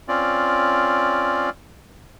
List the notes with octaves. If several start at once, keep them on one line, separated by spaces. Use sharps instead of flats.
C4 C#4 F4 D5